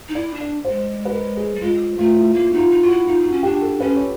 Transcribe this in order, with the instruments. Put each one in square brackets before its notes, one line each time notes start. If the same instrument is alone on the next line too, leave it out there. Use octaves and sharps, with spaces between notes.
[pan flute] D#4
[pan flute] E4 [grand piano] D5
[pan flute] D4
[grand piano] D5
C5
[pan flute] G#3
[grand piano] B4
A#4
G#4
[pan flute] G3
[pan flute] G#3 [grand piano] F4
[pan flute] A3 [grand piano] F4
[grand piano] E4
[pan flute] A#3 [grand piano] F4
[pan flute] D#4 [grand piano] F#4
[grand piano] F4
[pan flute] D#4
[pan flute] F4 [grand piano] F#4
[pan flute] E4
[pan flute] D#4 [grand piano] F4
[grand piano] F#4
[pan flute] C#4
[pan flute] D4 [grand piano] G4
[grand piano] A4
[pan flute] C#4 [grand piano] B4
[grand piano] C#5